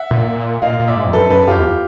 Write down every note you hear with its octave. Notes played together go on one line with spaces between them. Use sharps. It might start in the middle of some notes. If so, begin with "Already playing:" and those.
Already playing: E5 F#5
A#2
A#2 D#5 F5
A#2
D5 E5
G#2
F2
F#2 A4 B4
F#2 A4 B4
F#2 F4 G4
E2